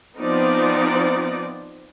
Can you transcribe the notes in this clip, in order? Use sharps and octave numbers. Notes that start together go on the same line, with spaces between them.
F3 B3 C4 D#4 D5